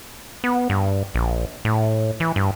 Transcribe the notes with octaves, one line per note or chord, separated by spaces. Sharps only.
B3
G2
A#1
A2
E3
G2